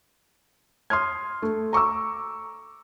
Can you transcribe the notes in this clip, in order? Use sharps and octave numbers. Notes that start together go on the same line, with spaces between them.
C6 D#6 F6 G#6
A3
A#5 C#6 D6 E6